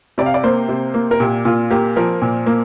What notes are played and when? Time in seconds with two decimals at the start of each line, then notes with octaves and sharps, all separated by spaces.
0.18 C3 D5
0.26 F5
0.34 D5
0.43 A#3 C5
0.68 C3
0.94 A#3
1.11 A#4
1.20 A#2 G4
1.45 A#2 F4
1.70 A#3 G4
1.96 F3 A#4
2.22 A#2
2.46 A#3